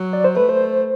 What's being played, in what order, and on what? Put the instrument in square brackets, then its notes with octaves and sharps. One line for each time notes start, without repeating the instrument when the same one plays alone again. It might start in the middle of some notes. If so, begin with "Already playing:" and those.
Already playing: [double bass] F#3
[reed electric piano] D5
C5
[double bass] A3 [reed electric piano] B4
[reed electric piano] C5